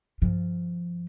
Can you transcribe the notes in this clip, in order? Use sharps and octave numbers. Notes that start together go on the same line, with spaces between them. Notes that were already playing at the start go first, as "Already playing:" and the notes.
G2 F3